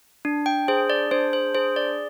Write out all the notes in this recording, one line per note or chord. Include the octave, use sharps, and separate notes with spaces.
D4
G5
G#4 C5
D5
D4 C5
C5
G#4 C5
D5